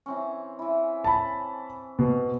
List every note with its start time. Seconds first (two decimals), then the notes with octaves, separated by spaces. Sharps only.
0.06 E3 C4 C#4
0.59 E3 E4
1.04 A5 B5
1.99 B2